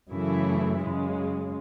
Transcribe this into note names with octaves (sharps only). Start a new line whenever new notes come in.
F#2 C#3 E3 A3 E4
F#2 C#3 G#3